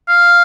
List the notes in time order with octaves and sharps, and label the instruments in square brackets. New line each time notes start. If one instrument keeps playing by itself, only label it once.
[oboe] F5